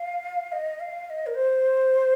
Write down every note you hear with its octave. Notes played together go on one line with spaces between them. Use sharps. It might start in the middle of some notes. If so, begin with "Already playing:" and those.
Already playing: F5
D#5
F5
F5
D#5
A#4
C5